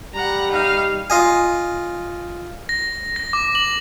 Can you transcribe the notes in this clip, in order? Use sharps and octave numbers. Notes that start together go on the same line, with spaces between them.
G3 F#5 A#5
D#4 F5
F4 D#5 G#5
A#6
A#6
D6
F#7